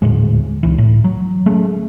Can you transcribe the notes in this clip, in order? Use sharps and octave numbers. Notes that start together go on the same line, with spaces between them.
D#1 D2 A2 G#3
C#2 E3
A2
F#3
G#3 A3 C#4